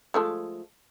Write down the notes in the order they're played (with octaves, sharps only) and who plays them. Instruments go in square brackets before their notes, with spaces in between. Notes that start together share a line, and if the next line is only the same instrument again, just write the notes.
[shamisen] F3 G#3 A3